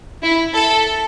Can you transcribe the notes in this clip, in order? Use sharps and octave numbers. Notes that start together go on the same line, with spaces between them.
E4
A4